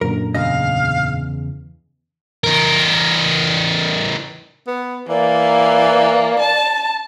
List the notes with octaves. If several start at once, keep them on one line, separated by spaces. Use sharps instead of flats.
F#2 A#2 D3 A#4
E2 C#3 D#5 F5
E3 A#4
B3
E3 A#3 D5
A5